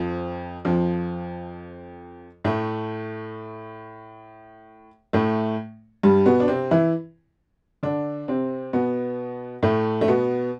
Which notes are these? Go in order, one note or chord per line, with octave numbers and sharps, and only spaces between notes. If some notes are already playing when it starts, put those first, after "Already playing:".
Already playing: F2 F3
F2 F3
A2 A3
A2 A3
G2 G3
B2 B3
D4
C3 C4
E3 E4
D3 D4
C3 C4
B2 B3
A2 A3
A3
B2 B3